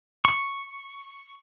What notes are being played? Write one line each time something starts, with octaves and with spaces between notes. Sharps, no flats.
C#6